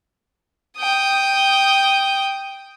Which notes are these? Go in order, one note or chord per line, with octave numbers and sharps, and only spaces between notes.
G5 D#6